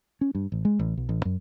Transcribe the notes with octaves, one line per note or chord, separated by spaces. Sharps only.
C#4
G2
A1
G#3
A1
B1
A1
F#2